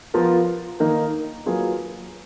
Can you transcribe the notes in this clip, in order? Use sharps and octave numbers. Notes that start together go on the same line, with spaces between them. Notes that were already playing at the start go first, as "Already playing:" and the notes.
F3 B3 F4 A#4
D#3 A#3 D#4 A#4
F#3 A#3 F4 G#4 B4